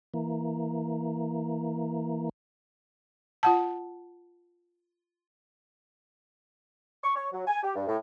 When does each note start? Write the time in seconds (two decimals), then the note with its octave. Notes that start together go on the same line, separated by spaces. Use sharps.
0.14 E3 A#3
3.43 F4 F#5 A5
7.03 C#6
7.15 C#5
7.32 F#3
7.47 G#5
7.63 G4
7.75 G2
7.87 A2